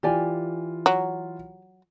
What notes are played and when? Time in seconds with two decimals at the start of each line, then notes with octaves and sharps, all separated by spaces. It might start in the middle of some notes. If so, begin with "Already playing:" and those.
0.03 E3 F4 G4 D5 G#5
0.86 F#3